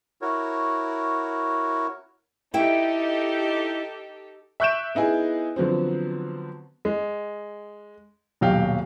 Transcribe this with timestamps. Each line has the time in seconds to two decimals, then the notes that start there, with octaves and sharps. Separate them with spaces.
0.22 E4 F#4 A#4 C#5
2.54 D#4 E4 G4 A4 E5 G5
4.60 E5 C#6 F#6 G6 D7 E7
4.95 B3 D#4 E4 G#4
5.56 D3 F3 F#3 B3 C4
6.85 G#3
8.41 D#1 B2 F#3 G4 F5 G5